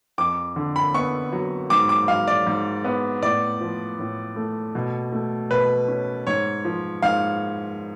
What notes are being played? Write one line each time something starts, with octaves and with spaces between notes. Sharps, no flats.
F2 D6
D3
B5
B3 C#6
F#3
G#2 D6
D6
F#3 F5
D5
G#2
B3
A2 D5
F3
A2
A3
B2
A3
B2 B4
C#4
G#2 C#5
F3
G#2 F5